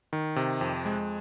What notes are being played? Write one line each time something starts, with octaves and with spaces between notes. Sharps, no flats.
D#3
C3
F2
G#3